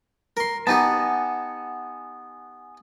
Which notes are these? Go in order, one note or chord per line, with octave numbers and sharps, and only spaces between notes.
A#4 C6
B3 D#4 G4 F#5 G#5 A5